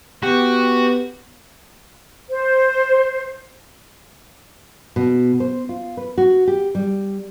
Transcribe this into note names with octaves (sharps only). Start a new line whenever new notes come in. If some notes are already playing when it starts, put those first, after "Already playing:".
B3 F#4 G4
C5
B2
C5
F4
B4
F#4
G4
G3